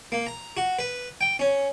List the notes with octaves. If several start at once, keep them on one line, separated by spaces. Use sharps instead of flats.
A#3
A#5
F#4
B4
G5
C#4